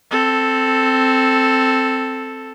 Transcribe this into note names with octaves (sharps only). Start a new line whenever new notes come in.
C4 A4